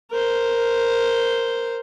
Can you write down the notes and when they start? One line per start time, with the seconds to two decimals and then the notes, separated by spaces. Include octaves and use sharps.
0.11 A#4 C5